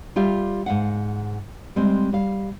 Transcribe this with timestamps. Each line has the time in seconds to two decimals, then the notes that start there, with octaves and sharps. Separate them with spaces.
0.16 G3 F4 G4 E5 F5
0.66 G#2 F5 F#5
1.76 G3 G#3 C4
2.13 G3 F5